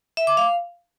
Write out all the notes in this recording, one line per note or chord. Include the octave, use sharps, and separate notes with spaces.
E5
D6
F5